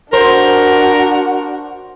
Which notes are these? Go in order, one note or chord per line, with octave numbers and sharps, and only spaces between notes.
D4 F#4 A#4 C5